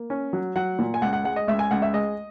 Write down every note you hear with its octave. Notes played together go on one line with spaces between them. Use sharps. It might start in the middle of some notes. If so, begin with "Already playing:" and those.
Already playing: A#3
C#4
F#3
F#3 F#5
A#2
G#5
C#2 F#5
F#5
G#3 F#5
D#5
C#2 E5
G#5
C#2 F#5
E5
G#3 D#5